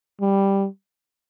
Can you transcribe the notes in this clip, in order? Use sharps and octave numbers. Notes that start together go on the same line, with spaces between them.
G3